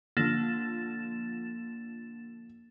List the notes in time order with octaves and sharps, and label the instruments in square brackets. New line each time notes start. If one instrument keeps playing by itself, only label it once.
[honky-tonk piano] D3 F3 [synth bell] A#3 A6 E7